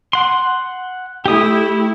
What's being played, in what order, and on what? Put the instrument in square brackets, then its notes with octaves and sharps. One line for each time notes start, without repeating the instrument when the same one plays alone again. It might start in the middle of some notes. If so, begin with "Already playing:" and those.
[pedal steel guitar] F#5 C6
[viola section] A3 E4 [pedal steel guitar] G4 D#6